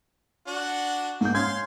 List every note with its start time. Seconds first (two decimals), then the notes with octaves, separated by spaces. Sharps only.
0.47 D4 F#4 F#5
1.21 G#2 A#3 G6
1.34 C#4 F5 C6 G#6